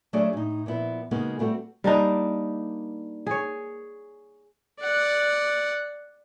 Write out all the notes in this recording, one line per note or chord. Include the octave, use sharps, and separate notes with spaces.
F#3 A3 D4 F#4 G#4 D5
A2 D#4
A#2 F3 B3 E4
C#3 G#3 A#3 B3 D#4 F#4
G3 A3 C4 E4 F#4
G3 A#3 D4 D#4
G#4 C#5
D5 F#5